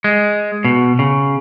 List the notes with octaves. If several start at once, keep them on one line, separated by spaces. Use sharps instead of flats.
G#3
B2
C#3